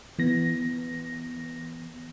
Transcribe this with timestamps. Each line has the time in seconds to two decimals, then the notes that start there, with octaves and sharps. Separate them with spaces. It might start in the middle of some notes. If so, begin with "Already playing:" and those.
0.19 E3 B3 A#6